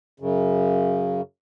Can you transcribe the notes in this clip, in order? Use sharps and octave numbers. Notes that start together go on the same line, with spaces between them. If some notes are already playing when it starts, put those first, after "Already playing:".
F#2 C#3